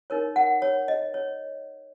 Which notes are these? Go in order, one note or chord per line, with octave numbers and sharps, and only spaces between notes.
D#4 A#4 C#5
F#5
C#5
D#5
C#5